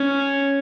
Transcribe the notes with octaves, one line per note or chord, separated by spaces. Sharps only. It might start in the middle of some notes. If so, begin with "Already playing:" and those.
Already playing: C#4